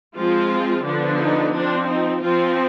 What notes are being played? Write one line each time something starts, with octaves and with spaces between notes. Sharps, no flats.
F3 G#3 C4 F4
D3 F3 B3 D4
D#4
F3 C4 D4
D#4
F3 C4 F4